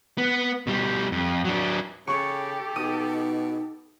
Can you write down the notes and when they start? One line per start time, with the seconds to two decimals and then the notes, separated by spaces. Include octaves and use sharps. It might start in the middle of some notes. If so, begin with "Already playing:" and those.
0.18 B3
0.67 B2 G3
1.12 F2
1.45 F#3 D4
2.07 C#3 G4 A4 C#6
2.76 B2 D#4 D#6